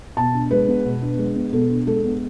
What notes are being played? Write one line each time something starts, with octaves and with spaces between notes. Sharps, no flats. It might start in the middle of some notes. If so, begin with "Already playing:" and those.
B2 A5
D4
G#3 B4
B3
B2
D4
G#3
B3
B2 A4
D4
G#3 A4
B3